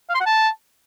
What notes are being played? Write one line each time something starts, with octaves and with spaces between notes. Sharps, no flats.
F5
C6
F#5
A5